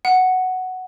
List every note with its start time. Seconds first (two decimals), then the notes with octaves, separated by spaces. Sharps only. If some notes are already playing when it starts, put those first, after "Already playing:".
0.05 F#5